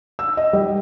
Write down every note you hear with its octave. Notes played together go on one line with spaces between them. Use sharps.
E6
D#5
G3